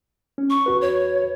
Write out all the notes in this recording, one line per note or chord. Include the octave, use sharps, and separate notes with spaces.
C#4
C#6
E2 F#4 B4
C#5